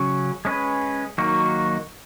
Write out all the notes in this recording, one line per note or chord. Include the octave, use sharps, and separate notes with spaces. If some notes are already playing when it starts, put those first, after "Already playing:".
Already playing: C#3 F#3 C#4
G#3 C#4 G#4 B4
D#3 F#3 A#3 D#4 F#4